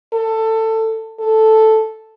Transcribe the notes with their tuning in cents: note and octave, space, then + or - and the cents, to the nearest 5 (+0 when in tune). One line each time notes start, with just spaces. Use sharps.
A4 +15
A4 -5